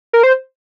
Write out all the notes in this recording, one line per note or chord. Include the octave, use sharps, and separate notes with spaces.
A#4
C5